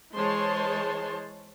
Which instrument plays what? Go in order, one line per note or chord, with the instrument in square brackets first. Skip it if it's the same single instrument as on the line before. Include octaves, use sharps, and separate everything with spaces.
[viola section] E3 G#3 C5 C#5 A5 C6